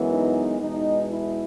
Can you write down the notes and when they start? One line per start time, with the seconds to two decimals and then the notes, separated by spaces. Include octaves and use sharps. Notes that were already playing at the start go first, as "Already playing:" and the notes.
Already playing: F#2 E3 G#3 B3
0.11 D#4
0.60 E2 B2 G#3 D#4
1.09 E4